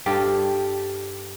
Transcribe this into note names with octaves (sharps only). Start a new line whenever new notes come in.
G2 G4 A4 F5